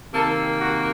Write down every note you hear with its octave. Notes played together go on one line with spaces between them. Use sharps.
C3 D#3 A#3 A4
F#4